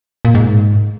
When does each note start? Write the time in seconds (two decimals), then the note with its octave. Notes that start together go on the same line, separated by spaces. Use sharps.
0.25 A#2
0.35 G#2